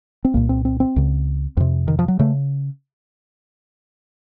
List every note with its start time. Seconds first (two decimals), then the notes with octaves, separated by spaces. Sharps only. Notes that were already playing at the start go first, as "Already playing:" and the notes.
0.25 C4
0.34 C2 A#2 A#3
0.49 C4
0.65 C4
0.80 C4
0.96 C#2 C#3
1.57 F2 C3
1.88 D#3
1.99 F3
2.08 F#3
2.19 C#3 A3